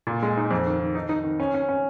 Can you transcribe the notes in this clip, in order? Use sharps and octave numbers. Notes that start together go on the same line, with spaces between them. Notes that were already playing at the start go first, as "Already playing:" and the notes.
A#2
G#3
D#4
F2
D#3
D#3
D#4
D#4
D#3
C#4
C#4
C#4